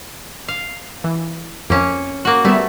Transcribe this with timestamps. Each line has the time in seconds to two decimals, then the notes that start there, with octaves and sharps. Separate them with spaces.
0.48 F5
1.04 E3
1.70 F2 A#3 C#4
2.25 A#3 F#4
2.45 G3 A3 B3 E5